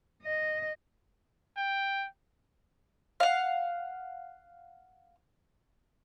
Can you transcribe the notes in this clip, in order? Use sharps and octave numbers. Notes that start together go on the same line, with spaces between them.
D#5
G5
F5 F#5